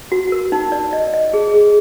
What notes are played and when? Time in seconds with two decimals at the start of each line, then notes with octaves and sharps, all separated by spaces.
0.12 F#4
0.32 A#4
0.52 D#4
0.72 D5
0.93 D#5
1.14 D#5
1.34 G#4
1.54 G#4